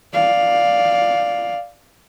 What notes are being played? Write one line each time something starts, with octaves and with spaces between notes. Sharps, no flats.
D5 F5